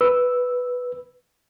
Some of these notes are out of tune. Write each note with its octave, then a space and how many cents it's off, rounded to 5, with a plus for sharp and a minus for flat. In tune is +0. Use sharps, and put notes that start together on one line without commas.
B4 +0 E6 +0